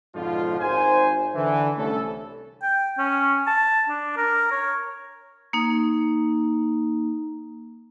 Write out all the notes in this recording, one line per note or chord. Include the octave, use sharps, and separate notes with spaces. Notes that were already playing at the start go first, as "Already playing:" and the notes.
F2 G#2 B2 D3 F3 F4
G#1 C5 G#5
D3 E3
C2 A3 C#4 A4
G5
C#4
A5
D4
A#4
C#5
A#3 D#4